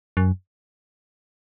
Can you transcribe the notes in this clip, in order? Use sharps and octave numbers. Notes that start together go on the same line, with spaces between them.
F#2